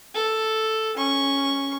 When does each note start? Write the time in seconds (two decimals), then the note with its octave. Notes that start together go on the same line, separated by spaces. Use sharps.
0.15 A4
0.97 C#4 C#6